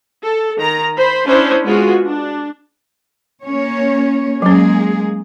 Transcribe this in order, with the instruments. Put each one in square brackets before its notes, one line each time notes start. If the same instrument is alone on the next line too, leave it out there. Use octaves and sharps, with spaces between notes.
[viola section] A4
D#3 A#5
C5 B5
C#4 D4 E4 C5
G#3 B3 F4 F#4 G#4
D4
[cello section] A#3 C#4 C#5
[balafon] F#3 C#4 [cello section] G#3 A#3 G#4